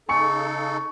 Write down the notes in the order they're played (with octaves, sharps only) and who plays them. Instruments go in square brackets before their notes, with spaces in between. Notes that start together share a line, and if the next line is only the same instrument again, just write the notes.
[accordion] C#3 D#4 A4 [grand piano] G#5 C#6 C#7